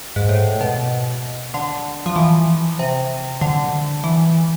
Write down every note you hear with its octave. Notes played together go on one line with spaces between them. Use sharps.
G#2
A2
B2
D3
F3
E3
C3
D3
E3